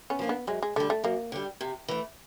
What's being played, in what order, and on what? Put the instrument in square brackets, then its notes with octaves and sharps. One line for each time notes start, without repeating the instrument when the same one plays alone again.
[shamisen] B3 C#4
[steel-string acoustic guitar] F3 A#3 D4
[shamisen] B3
[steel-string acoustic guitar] F#2 [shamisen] G#3
[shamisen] G#3
[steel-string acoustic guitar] D3 G3 [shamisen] A3
[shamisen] A3
[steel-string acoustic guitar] F#2 [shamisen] A#3
[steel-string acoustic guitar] D3 G3
C3
E3 A3